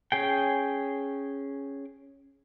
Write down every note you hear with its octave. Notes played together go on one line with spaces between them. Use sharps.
C#4 G#4 G5